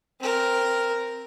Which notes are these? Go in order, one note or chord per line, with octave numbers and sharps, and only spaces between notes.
C4 A#4